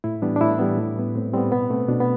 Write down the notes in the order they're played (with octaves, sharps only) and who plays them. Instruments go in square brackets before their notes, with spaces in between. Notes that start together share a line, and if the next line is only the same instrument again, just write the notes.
[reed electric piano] A2 E4
E3 G3 B3 D4
D4
A2 E4
E3 G3 B3
A2
G3 B3
A2 C4
G3 B3 C4
B2 B3
A3 C4
B2 D4
B3